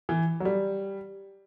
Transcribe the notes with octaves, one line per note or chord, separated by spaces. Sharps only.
E3
F#3
G3